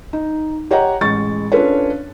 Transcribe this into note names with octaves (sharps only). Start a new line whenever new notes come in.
D#4
G4 C#5 D#5 F#5 A#5
A1 G#3 C#6 A6
C#4 D4 F4 A4 B4 C#5